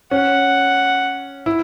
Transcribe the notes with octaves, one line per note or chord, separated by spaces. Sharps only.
C#4 F#5
E4